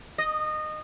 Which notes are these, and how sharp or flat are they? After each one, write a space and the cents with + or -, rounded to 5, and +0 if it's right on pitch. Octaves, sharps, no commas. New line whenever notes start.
D#5 -20